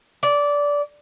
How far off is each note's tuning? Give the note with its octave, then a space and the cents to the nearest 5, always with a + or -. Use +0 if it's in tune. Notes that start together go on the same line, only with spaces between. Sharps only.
D5 -15